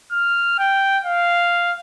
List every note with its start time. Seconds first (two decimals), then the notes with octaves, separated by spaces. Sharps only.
0.12 F6
0.59 G5
1.05 F5